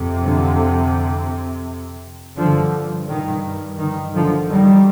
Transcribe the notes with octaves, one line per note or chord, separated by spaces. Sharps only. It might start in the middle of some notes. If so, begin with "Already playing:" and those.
Already playing: F2 C3
D3 F3
G2 D3 F3
D#3
D#3
D3 F3
D#3 G3